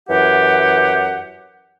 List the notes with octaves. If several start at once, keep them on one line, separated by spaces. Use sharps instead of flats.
F#2 E3 G4 F#5